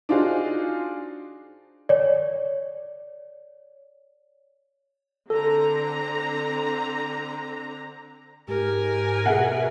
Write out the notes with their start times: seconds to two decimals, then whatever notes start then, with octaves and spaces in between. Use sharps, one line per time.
0.09 D4 D#4 F4 F#4 G#4 C5
1.89 C#5 D5
5.30 D3 C4 A4 A#5
8.48 G#2 G4 A#4 G#5
9.26 B2 G#4 E5 F#5